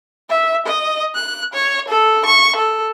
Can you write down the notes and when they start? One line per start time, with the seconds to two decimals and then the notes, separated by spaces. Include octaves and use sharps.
0.29 E5
0.66 D#5
1.15 F#6
1.54 C#5
1.88 A4
2.25 C#6
2.56 A4